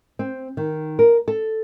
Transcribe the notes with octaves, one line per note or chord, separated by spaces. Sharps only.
C4
D#3
A#4
A4